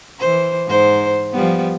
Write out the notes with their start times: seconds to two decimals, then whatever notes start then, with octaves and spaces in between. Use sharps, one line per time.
0.19 E3 C5
0.68 G#2 C5
1.33 F3 G3 B3